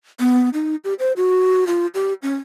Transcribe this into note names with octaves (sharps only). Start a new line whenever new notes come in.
B3
D#4
G4
C5
F#4
F4
G4
C#4